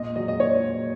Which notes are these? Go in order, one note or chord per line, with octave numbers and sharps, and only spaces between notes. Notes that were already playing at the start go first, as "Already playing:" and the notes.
Already playing: A#2 D#5
F#3 D#5
D#5
A#2 C#5